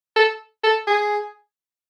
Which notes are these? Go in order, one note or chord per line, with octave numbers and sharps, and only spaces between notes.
A4
A4
G#4